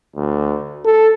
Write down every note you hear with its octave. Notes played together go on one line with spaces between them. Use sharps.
D2
A4